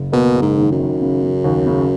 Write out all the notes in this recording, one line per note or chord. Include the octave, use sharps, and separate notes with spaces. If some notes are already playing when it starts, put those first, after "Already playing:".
Already playing: F#1
B2 A#3
F#1
G#2
D#3
F#2
D#3
C#3
C#3
D#2
C#3